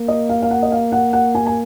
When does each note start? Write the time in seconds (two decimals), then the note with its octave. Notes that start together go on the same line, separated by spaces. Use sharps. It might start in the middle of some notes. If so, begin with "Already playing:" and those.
Already playing: A#3
0.08 D#5
0.29 F5
0.42 F5
0.51 F#5
0.63 D#5
0.72 F5
0.92 F#5
1.13 F#5
1.35 G#5
1.46 G#5